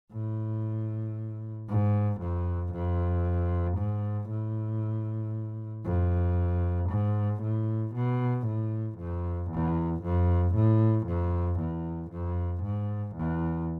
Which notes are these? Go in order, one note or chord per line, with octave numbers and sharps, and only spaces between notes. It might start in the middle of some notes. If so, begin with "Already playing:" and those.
A2
G#2
F2
F2
G#2
A2
F2
G#2
A2
B2
A2
F2
E2
F2
A2
F2
E2
F2
G#2
E2